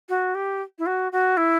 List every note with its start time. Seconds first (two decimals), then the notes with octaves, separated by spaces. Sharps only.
0.09 F#4
0.35 G4
0.79 E4
0.86 F#4
1.12 F#4
1.37 E4